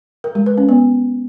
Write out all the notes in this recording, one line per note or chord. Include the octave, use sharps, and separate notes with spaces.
A#4
G#3
B4
C#4
B3